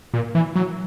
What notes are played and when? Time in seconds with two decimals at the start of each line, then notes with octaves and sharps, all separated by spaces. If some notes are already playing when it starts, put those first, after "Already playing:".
0.14 A#2
0.35 E3
0.55 F#3